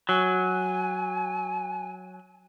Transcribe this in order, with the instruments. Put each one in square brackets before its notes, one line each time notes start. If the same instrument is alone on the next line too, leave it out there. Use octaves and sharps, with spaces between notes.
[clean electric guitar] F#3 [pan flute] G#5